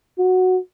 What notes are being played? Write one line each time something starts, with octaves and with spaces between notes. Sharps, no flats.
F#4